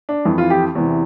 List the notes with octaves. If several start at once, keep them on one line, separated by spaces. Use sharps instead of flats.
D4
F2 E3
F4
G4
E2 C3 E3